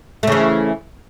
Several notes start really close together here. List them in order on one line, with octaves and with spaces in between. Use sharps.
A3 C#3 E3